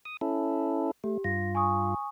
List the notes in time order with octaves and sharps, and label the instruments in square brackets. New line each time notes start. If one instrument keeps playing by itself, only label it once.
[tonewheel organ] D#6
C#4 E4 A4
[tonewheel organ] A3 [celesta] G4
[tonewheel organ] G2 F4 [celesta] A#6
[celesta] G#5 C#6 D#6